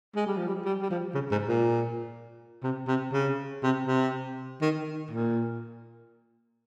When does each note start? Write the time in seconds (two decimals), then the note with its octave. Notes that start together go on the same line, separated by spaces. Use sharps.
0.16 G#3
0.26 G3
0.37 F3
0.48 G3
0.65 G3
0.82 G3
0.90 F3
1.15 C#3
1.31 G#2
1.48 A#2
2.63 C3
2.88 C3
3.13 C#3
3.63 C3
3.87 C3
4.62 D#3
5.11 A#2